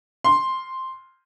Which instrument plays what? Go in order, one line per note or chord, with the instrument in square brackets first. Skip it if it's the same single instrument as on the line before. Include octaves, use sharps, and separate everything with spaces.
[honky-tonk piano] C6